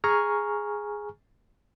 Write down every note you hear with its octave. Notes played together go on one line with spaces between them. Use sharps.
G#4 G#5 A#5 C#6 F6